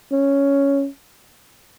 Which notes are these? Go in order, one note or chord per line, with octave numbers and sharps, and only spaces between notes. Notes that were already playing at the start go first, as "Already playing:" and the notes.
C#4